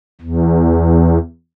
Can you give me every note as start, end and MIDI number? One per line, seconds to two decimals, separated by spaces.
0.21 1.18 40